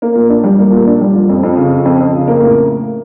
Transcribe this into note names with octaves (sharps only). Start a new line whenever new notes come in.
A#3
A#2
D4
G3
A#3
A#2
D4
G3
F3
F2
F2
C#3
F3
F2
F2
C#3
A#3
A2